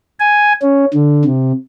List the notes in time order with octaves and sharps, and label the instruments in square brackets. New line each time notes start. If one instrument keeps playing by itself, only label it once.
[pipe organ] G#5
C#4
D3
C3